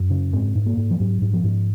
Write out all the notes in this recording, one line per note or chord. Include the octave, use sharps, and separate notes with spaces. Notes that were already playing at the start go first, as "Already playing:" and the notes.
Already playing: F#2
C#3
G#2 C4
G#2
A#3
G#2
F3
G#2 F#3
G#2
F3
G#2